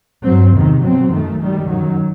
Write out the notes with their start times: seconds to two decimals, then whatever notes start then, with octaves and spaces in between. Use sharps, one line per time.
0.24 G2 F#3 C4
0.53 E2 C3 D#3
0.82 B2 F#3 C4
1.11 F#2 D#3 A3
1.40 F#2 D#3 G3
1.69 F#2 D#3 F#3